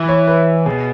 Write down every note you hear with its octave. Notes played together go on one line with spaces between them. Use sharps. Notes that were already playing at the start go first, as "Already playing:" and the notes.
Already playing: E3 E5
C#5
B4
B2 G#4